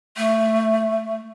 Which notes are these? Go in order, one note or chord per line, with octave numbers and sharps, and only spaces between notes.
A3